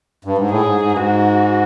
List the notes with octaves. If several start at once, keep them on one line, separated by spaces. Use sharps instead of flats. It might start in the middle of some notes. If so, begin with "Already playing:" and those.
G2
G#2
A2 G#4
G#2
G#2
G2
G#2 F#4